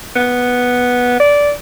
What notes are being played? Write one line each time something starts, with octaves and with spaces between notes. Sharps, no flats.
B3
D5